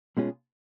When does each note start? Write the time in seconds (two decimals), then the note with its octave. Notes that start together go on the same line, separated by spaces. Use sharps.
0.17 B2 G#3 C#4 F4 G#4